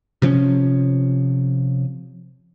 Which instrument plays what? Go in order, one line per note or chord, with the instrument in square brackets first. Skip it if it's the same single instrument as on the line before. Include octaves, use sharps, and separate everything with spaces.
[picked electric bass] C3 F3 C4 C#4